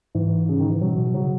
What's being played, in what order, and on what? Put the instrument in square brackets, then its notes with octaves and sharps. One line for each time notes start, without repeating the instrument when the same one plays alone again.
[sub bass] G#2 [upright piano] E3
[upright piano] C#3
D#3
E3
[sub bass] B2 [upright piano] F#3
[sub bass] B2
[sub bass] C#3 [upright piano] F#3